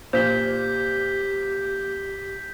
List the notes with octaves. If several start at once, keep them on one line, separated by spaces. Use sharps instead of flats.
A#2 G4 C5 G6 B6 G7